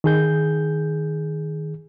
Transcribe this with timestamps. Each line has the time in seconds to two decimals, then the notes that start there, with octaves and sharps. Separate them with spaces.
0.04 D#3 G#4 G6